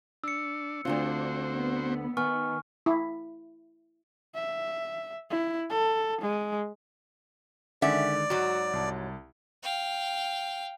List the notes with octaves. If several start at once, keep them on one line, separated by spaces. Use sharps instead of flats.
D4 E6 C#7
D2 D3 C4 D4 F4 F#4 C5
B3
D#3 B3 G#5 C#6 F6
E4
E5
E4
A4
G#3
D3 D#3 G#3 C#4 D5 E5 F#5
G#2 F#3 F#4
C2 A5
F5 G5